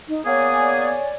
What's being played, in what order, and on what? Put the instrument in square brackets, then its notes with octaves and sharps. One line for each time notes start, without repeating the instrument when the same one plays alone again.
[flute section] D#4
[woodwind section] A#3 B3 G#4 [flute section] C#5 D5 G#5